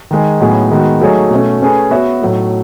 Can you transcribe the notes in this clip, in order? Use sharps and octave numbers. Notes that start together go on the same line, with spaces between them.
D#3 G#3 D#4 G#4
A2 F#3 B3 D#4 G#4
D#3 G#3 B3 F#4
F#3 A3 D#4 G#4 C#5
B2 A3 C#4
A3 C#4 G#4 B4
B3 F#4 C#5 E5
A2 F#3 A3 D#4